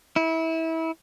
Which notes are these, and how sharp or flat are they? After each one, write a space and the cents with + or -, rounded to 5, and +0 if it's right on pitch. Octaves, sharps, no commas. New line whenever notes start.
E4 -25